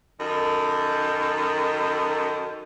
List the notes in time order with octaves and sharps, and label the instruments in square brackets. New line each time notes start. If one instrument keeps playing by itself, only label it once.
[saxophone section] F#2 D#3 A4